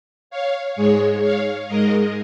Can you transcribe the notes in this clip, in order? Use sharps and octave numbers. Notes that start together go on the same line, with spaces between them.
C#5 F5
G#2 G#3 G#4 C#5
C#5 F5
G#2 G#3 A#4 D#5